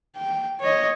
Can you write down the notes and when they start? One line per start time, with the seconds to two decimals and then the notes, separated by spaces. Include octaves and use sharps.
0.16 G5
0.60 C#5 D#5